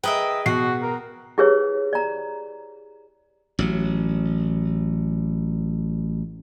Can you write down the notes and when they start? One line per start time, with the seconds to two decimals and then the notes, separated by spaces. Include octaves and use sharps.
0.03 G#4 A#4 B4 D#5 E5 G5
0.46 B2 F#4 F#5 C7
0.82 A#4
1.38 E4 G4 G#4 B4 C#5
1.93 D5 A#5
3.59 A1 F#3